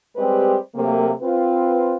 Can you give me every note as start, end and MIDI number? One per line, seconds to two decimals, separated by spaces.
0.17 0.56 55
0.17 0.56 56
0.17 0.56 60
0.17 0.56 67
0.17 0.56 71
0.17 0.56 72
0.75 1.12 48
0.75 1.12 54
0.75 1.12 57
0.75 1.12 58
1.21 1.96 60
1.21 1.96 65
1.21 1.96 71